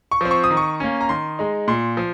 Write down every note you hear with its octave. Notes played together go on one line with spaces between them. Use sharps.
C#6
F3 C4
C#6
D#6
D#3
C#6
A#3 C#4
A#5
D#3 C6
G#3 D#4
A#2 C6
F3